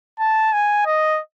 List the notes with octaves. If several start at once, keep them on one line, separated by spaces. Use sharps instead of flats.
A5
G#5
D#5